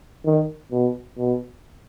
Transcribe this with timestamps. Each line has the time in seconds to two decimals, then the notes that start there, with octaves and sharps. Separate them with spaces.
0.25 D#3
0.71 B2
1.18 B2